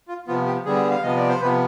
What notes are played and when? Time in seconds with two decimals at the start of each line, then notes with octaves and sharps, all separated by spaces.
0.08 F4
0.27 C3 F3 B3 F4
0.46 G4
0.65 D3 G3 B3 G#4
0.91 F5
1.03 C3 F3 B3 D#5
1.16 D5
1.28 C5
1.41 C3 F3 B3 B4